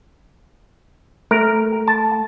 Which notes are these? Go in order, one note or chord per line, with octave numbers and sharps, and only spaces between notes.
A3 A#4
A5